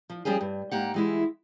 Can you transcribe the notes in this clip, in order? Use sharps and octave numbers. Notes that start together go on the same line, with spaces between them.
F3
F3 G3 C#4 G4 G#4
G2
G#2 A#3 G4 F#5
E3 G#3 E4